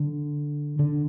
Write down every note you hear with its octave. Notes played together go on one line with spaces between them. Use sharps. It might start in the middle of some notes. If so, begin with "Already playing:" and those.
Already playing: D3
D3